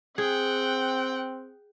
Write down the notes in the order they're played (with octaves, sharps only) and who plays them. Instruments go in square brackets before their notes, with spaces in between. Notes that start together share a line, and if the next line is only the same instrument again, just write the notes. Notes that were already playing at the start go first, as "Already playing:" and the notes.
[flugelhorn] C4 [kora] G#4 [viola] F#5 G5